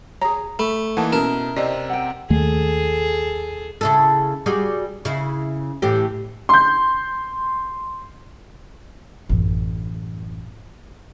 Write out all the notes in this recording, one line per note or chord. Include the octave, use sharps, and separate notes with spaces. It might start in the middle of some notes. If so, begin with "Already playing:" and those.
G#4 C#5 A#5
A3 B5
E3 A#3 D#4 F#5 A5
B2 C#4 E4 A4 A#4 E7
C3 C4 D5 D#5
F#5 G5
D#2 D#3 A3 G#4 A4
C#3 E4 A4
G3 F#4 G#4
C#3 E4
A2 E3 G4
C6 G6
A1 F#2